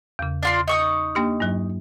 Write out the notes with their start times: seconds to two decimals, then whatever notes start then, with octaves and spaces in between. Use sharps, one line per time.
0.19 E2 C#3
0.43 D4 F4 C6
0.68 D#4 C#6 D#6
1.15 A#3 D4 G4
1.40 G2 F#3